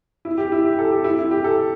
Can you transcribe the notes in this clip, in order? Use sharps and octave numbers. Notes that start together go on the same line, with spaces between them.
E4
G4
E4
G4
A4
G4
E4
E4
G4
A4